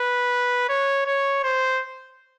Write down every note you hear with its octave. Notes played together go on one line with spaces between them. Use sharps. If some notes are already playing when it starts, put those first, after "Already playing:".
Already playing: B4
C#5
C#5
C5